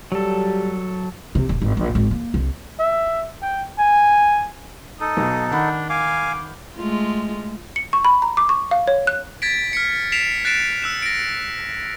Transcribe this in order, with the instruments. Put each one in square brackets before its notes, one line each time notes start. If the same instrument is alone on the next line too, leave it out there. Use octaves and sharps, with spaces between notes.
[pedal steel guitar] F#3 A4 [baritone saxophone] G3
[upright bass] C3
D#1
G#1
A#1
G#1
A#3
C2
[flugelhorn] E5
G5
G#5
[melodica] D#4 A4 [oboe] D#6
[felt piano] B1 B2
[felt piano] D#3 F#5 B5 [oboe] D4
[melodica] F5 G#5 [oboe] D6
[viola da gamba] G#3 A3 F4
[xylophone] C#7
C#6
B5
A#5
D6
C#6
F5
C#5
F#6
[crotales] G#6 A6 B6 D7
F6 B6 C#7
B6 C7 D7 E7 F7
F#6 A6 B6 C7 D7 E7
E6 F#6 E7
A#6 D7